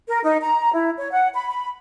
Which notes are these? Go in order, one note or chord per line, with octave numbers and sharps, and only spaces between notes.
A#4
D#4
A#5
E4
C#5
F#5
B5
B5